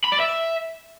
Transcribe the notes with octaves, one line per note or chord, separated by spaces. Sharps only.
B5
D5
E5